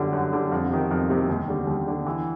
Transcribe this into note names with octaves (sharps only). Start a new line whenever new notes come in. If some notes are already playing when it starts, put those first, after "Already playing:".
Already playing: F#2 D3 G3
F#2
D3 G3
F2
C3 D#3
F2
C3 D#3
D#2
D3 G3
D#2
D3 G3
E3